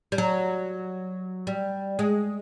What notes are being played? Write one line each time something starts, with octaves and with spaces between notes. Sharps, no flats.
G3
F#3
G3
G#3